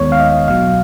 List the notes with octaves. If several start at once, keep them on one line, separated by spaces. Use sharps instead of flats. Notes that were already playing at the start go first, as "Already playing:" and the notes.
Already playing: D#2 D#3 G#3 B3 C#5
F5
D#5
B1 B2 F#3 F5